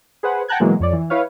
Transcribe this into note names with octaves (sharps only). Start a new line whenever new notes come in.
G#4 B4 C5 F#5
F#5 G5 A5 A#5 F#6 G#6
B2 E3 F#3 G#3 A#3
F2 C#5 D5
E3
E4 B4 C#5 F5